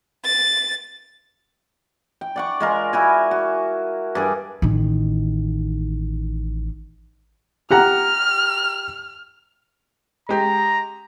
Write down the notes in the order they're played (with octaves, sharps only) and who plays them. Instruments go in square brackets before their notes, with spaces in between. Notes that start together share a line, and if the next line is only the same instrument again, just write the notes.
[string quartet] A6
[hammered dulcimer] G5
D5 F#5 C#6
G#3 F4 A#4
E4 F#4 G#5
F#4
G2 G#4 D6
[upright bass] A1 D#3
[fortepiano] G4 F#5 A#5 [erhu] F6
[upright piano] G#3 G4 [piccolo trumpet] A#5